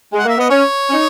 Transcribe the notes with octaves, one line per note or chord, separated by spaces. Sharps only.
G#3
F#5
A#3 E5
B3 D#5
C#4 C#5
C#4
D#4